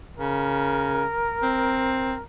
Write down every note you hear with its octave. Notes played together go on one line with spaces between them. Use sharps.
C#3 A#4
C4